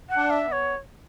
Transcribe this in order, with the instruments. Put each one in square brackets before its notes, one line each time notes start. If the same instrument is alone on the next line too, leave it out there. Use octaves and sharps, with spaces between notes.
[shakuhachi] F#5
[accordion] D4
[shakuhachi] E5
[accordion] B3
[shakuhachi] C#5